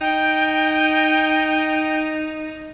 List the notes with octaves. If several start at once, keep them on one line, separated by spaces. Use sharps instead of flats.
D#4 G5